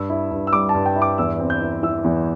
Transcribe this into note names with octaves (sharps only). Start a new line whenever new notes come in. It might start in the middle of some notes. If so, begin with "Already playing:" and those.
Already playing: G2 E6
E4
G2
E6
G3 D6
A5
G2
G5
E4
D6
E2 E6
C4
G6
E4
E3 E6
E2